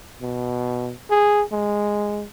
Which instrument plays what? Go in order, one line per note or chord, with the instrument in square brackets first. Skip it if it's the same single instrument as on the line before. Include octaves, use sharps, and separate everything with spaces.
[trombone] B2
G#4
G#3